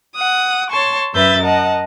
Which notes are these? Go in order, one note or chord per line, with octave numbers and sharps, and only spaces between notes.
F#5 D#6
C#5 A5 C6 C#6
F#2 B4 E5 E6 G6 A6
A#4 D#5 F#5 A5